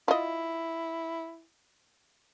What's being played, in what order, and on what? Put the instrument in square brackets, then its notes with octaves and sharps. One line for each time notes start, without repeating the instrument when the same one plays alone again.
[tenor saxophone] E4 [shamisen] F4 D#5